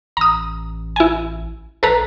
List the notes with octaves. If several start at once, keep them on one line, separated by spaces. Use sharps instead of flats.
A1 A#5 D#6
E4 G#5
A#1 A4 B4 A#5